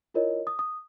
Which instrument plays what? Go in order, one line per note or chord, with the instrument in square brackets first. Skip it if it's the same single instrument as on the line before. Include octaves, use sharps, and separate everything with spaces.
[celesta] E4 F4 A#4 C#5 D#5
D#6
D#6